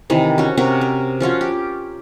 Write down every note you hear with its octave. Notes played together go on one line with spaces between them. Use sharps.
C3 D#3 E3
C#4 F#4
C3 C#4 F#4 A#4
A#4
F3 C#4 F4 F#4
G4